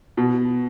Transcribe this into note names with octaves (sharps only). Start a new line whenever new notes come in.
B2